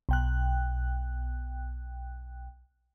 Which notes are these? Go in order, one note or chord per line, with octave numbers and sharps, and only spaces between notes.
B1 G5 F#6